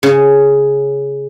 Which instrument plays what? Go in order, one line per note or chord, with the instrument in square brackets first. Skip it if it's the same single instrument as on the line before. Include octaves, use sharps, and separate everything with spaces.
[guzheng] C#3